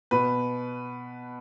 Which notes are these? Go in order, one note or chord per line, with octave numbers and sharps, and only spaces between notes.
B2 B4